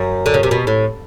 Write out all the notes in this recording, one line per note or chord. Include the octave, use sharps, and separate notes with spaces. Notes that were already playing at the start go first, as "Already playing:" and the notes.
Already playing: F#2
D3
C#3
C3
B2
A2